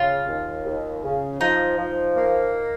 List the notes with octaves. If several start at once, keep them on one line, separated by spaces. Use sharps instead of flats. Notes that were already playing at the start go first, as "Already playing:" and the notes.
Already playing: C#3 F4
D#2
D#2
C#3
F3 D#4
F3
A#3